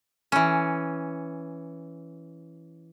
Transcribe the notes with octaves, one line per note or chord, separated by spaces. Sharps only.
E3 C#4